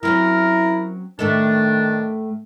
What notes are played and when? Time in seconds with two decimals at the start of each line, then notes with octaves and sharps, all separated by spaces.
0.03 F#3 C4 C#4 E4 A#4
1.19 A2 D#3 A3 D4 A4